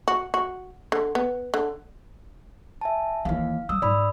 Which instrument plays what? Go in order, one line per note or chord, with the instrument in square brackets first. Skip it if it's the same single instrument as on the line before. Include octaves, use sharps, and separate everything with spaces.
[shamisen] F#4
F#4
D3
B3
D3
[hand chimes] E5 G#5 A5
[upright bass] D#2 E3 [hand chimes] F5
[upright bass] G3 [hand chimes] D#6 E6
[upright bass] G#2 [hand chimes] D5 B5